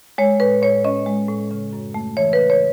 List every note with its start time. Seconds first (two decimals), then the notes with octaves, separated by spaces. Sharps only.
0.18 G#3 C#5
0.40 A2 B4
0.62 A2 C#5
0.85 C#4 D#5
1.06 G#3
1.28 A2
1.51 C#3
1.73 F#2
1.94 A3
2.17 E3 C#5
2.33 B4
2.39 C#3
2.50 C#5